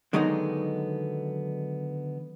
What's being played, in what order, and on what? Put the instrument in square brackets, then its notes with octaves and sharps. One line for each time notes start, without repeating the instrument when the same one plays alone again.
[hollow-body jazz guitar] D3 D#3 F#3 G#3 B3 D#4